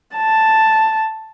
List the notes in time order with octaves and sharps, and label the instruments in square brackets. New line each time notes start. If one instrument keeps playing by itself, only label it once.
[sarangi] A5